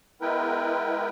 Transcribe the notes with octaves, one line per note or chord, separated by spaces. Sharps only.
G#3 B3 E4 A#4 B4 G5